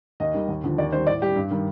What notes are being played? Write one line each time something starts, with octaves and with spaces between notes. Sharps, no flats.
D#2 D#5
D#3 G3
D#2
D3 F3
D#2 D5
D#3 G3 C5
A2 D5
G3 G4
G2
D#3 G3